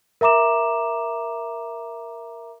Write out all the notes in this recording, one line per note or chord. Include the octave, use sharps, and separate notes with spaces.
A#4 E5 A#5 D6 E7